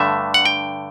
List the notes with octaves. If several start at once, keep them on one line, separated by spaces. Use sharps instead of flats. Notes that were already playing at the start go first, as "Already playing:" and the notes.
Already playing: G2 D3 A3 E5
F#5
G5